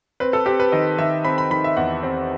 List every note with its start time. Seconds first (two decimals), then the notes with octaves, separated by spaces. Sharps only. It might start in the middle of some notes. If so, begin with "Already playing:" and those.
0.20 C4 B4
0.33 A4
0.46 C4 G4
0.60 B4
0.72 D#3 D#5
0.98 D#3 E5
1.25 C4 B5
1.38 B5
1.51 D#3 B5
1.64 E5
1.77 E2 F#5
2.03 C4